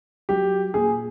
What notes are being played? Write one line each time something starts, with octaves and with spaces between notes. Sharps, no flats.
F#3 G4
A#2 G#4